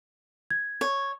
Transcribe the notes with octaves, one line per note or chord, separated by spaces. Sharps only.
G#6
C#5